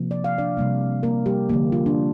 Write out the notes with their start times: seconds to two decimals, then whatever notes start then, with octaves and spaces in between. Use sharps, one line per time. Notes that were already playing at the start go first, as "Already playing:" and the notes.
Already playing: C3 F3 A#3
0.11 D5
0.24 F5
0.38 D4 D5
0.57 C3 G3 A#3
1.03 A#3 A#4
1.26 G3 G4
1.49 D3 F3 A#3
1.72 F4
1.86 D4